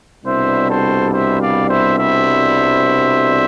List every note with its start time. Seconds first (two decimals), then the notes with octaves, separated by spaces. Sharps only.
0.24 C2 B2 G3 D4 C5 E5
0.68 A4 C5
1.11 C5 E5
1.40 D5 F5
1.69 C5 E5
1.97 C5 E5